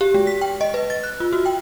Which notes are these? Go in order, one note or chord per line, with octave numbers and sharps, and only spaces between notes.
G4
G#3
B6
G5
D#5
B4
A6
F#6
F4
F#4
G5